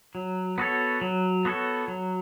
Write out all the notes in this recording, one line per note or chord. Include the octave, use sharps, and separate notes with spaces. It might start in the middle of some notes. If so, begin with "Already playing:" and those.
F#3
B3 F#4 A4 C#5
F#3
B3 F#4 A4 C#5
F#3